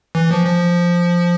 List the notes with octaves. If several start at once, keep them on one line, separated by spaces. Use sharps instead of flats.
E3
F3
F3